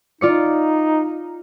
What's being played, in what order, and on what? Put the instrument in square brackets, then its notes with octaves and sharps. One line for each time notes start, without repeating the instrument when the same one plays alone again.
[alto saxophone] D#4 [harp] F4 D5 C#7